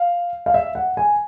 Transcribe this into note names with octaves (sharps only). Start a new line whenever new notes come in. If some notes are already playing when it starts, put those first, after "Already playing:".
Already playing: F5
F5
E5
F#5
G#5